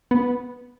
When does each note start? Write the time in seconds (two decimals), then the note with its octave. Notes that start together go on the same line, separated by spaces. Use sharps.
0.11 B3